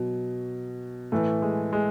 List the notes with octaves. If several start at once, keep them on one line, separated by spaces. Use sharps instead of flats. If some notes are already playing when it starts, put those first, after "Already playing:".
Already playing: B2 F#3
A2 E3 A3
G#3
G#3